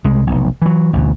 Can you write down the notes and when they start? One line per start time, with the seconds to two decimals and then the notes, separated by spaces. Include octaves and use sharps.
0.04 C2 G#3
0.27 F1 B1
0.62 E3 F#3
0.93 A1 D2 B2